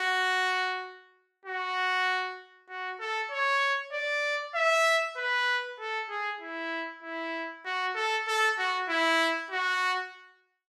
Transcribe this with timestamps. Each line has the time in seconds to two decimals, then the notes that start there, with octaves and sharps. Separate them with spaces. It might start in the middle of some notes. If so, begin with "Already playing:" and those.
Already playing: F#4
1.45 F#4
2.69 F#4
3.00 A4
3.31 C#5
3.93 D5
4.55 E5
5.17 B4
5.80 A4
6.10 G#4
6.41 E4
7.03 E4
7.65 F#4
7.96 A4
8.28 A4
8.58 F#4
8.89 E4
9.50 F#4